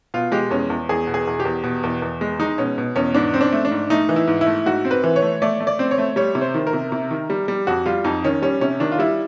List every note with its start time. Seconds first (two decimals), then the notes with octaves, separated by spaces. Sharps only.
0.14 B2 F4
0.32 G#3 G4
0.51 E2 C#4
0.70 E2
0.89 E2 G#4
1.07 B2
1.14 G#4
1.27 E2
1.40 G4
1.45 E2
1.64 B2
1.83 E2
2.02 E2
2.21 G#3
2.40 G#3 D#4
2.58 B2 C#4
2.78 B2
2.96 E2 C#4
3.14 G#2 D4
3.34 C4
3.41 D4
3.53 A3
3.65 D4
3.71 G#2
3.90 A3 D#4
4.09 E3
4.16 E4
4.28 G#2
4.41 E4
4.46 A3
4.66 G#2 F#4
4.85 C4
4.91 B4
5.04 E3
5.16 C#5
5.22 A3
5.42 A3 D5
5.60 A3
5.67 D5
5.79 C4
5.91 C#5
5.98 A3
6.16 G3 C#5
6.35 C3
6.41 C5
6.54 D#3
6.67 A#4
6.73 C3
6.92 C3
7.11 D#3
7.30 G3
7.48 G3
7.67 F2 F#4
7.86 G3 F4
8.04 F2 D#4
8.24 D#3 C#4
8.42 G3 C#4
8.61 C3 C#4
8.80 D#3 D4
8.92 F4
8.99 G3 E4